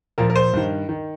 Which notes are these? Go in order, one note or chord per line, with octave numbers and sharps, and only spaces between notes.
A#2 F3 A#4
A#4
C5
G2 D#3
D#3